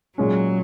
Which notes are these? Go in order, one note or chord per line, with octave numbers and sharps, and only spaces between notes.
A#2 F#3 G#3 C#4